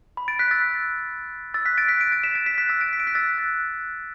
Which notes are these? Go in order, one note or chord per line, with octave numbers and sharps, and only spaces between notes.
B5
A6 D7
F#6 B6
E6 A6
E6 A6
F#6 B6
A6 D7
F#6 B6
A6 D7
A6 D7
B6 E7
A6 D7
B6 E7
F#6 B6
E6 A6
A6 D7
B6
D7
F#6 B6
E6 A6
F#6